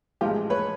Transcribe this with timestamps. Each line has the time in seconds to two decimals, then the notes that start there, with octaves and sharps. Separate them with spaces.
0.21 A1 G#2 F3 G#3 F4 G4
0.50 B4 C#5